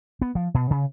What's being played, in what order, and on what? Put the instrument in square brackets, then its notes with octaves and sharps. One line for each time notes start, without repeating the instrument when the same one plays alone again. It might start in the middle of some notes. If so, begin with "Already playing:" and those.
[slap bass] B3
F3
B2
C#3